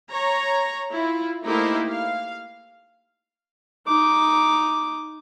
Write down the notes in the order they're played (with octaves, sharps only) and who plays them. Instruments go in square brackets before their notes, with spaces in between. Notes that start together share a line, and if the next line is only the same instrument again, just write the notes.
[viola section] C#5 A#5
E4 F4
A3 A#3 D#4 E4 G4 C5
F5
[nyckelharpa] D#4 D6